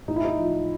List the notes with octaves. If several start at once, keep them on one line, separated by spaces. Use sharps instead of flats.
A2 D#4
E4
D#4
F3